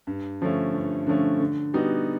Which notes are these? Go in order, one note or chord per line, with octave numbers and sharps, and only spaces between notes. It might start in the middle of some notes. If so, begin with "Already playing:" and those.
G2
D3 F3 A3 C#4
G2
D3 F3 A3 C#4
D3
G3 B3 D#4 F#4